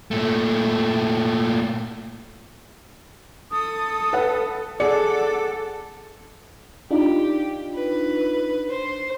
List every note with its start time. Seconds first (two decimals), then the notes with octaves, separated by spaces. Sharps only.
0.11 A#2 A3
3.52 A4 D#6
4.13 B4 F#5
4.80 G#4 A4 D5 F#5 D6 C#7
6.91 D4 D#4 F4 G4
7.74 B4
8.69 C5